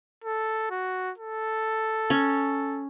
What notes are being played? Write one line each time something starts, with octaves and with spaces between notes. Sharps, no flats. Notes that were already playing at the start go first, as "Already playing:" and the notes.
A4
F#4
A4
C#4